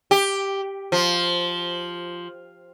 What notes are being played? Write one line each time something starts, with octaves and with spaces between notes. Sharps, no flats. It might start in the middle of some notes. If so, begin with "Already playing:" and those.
G4
F3